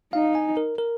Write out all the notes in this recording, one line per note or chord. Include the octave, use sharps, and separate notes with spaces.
D#4 F5
G#5
A#4
A#4